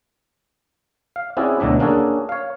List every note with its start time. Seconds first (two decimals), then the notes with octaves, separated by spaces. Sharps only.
1.16 F5
1.37 C4 C#4 E4 F#4 G#4 D5
1.60 D2 B2 F#3 D4 E5
1.80 A#3 C#4 D4 F#4 G#4 A4
2.29 C#5 F5